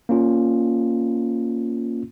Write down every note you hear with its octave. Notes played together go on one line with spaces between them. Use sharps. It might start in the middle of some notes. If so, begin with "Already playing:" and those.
A#3 C#4 F4